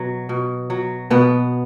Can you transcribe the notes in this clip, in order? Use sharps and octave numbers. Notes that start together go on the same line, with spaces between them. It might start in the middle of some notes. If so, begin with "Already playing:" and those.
Already playing: B2 F#3
B2
F#3
B2 B3